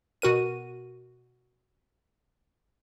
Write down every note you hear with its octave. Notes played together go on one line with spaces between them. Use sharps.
B2 F#4 A#4 D#7